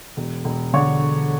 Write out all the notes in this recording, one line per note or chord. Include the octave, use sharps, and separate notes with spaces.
E1
E1
D3 C#5